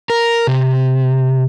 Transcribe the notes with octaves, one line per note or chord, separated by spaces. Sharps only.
A#4
C3